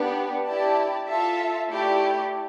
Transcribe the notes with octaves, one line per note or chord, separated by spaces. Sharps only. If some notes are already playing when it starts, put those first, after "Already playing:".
Already playing: B3 D4 G4
E4 G4 D5 A5
F4 A4 E5 A5
A3 E4 G4 D5